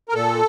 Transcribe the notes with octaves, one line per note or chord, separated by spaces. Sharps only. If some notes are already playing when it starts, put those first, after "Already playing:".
A#4
A#2 A4